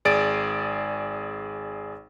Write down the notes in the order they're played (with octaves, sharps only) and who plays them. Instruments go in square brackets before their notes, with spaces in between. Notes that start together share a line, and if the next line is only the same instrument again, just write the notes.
[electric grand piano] G#1 G#4 D5 A6 D7